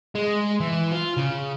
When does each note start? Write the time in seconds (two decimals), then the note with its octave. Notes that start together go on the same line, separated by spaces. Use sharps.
0.15 G#3
0.60 E3
0.91 F4
1.17 C#3